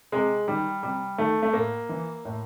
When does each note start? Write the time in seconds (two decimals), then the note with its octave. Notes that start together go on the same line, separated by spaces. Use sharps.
0.12 C3 G#3
0.48 D#3 G3
0.83 C3 G3
1.18 D#3 A3
1.43 A3
1.53 A2 A#3
1.89 E3
2.25 A2